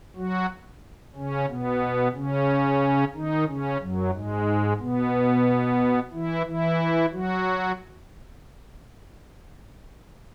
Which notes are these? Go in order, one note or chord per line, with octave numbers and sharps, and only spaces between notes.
F#3 F#4
C#3 C#4
B2 B3
C#3 C#4
D#3 D#4
C#3 C#4
F#2 F#3
G#2 G#3
B2 B3
E3 E4
E3 E4
F#3 F#4